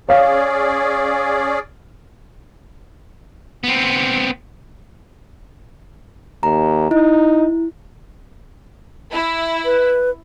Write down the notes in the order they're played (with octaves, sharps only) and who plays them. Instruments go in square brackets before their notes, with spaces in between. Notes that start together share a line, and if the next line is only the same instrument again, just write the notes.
[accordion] C#4 G#4 D5 [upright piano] C#5 F5
[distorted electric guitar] B3 C4
[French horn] D#2 [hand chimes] A#5
[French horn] D#4 [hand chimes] E4
[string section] E4
[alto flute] B4